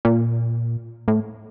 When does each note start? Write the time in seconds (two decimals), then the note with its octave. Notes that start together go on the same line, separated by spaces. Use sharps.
0.05 A#2
1.08 A2